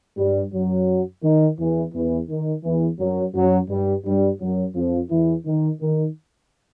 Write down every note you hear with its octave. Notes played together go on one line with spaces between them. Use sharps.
G2 G3
F#2 F#3
D#3
E2 E3
E2 E3
D#3
E2 E3
F#2 F#3
F#2 F#3
G2 G3
G2 G3
F#2 F#3
F2 F3
E2 E3
D#3
D#3